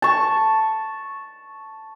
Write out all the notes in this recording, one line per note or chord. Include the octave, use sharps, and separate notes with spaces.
A5 C#6